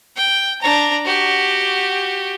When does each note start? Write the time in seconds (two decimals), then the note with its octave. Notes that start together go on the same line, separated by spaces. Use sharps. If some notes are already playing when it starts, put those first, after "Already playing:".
0.16 G5
0.61 D4 A#5
1.05 F#4 G4